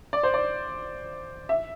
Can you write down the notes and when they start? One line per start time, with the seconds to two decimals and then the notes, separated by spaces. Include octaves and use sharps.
0.13 D5
0.23 C5
0.34 D5
1.49 E5